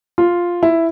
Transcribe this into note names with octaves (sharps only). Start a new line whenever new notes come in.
F4
E4